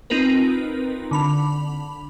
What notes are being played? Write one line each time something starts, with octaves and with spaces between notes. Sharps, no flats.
C4 D#4 F4 A#4 B4
D3 B5 F7